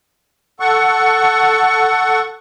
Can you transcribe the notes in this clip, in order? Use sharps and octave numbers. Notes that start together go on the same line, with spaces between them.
A4 F#5 C#6